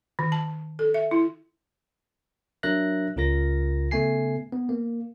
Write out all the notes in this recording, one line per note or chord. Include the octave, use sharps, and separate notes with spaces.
D#3
A5
A4
E5
E4
F#3 D4 A#4 E5 F#6 A#6
C#2 C#3 F4 A#4 F5 A#6
C#3 A3 B3 G#5 C7
B3
A#3